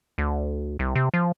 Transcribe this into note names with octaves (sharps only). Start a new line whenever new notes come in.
D2
C2
C3
F3